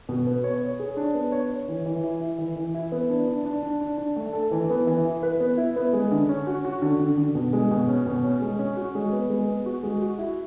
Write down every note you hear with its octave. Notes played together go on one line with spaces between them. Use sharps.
B2
B3
C#5
C#5
G#4
D4
B3
C#5
C#5
E3
E3
E4
E4
E3
E3
E4
B3
D4
D4
D4
D4
D4
D4
A3
A4
E3
B3
E3
E4
B4
B3
E4
B3
G#3
D3
C#4
F#4
F#4
D3
D3
D3
B2
G#3
B2
C#4
B2
C#4
G#3
C#4
F#4
G#3
B3
G#3
B3
F#4
G#3
F#4
E4